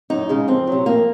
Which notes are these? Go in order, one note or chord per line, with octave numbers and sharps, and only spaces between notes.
F#2 D#4
C#3 G#3
F2 C4
C3 F#3
F2 A#3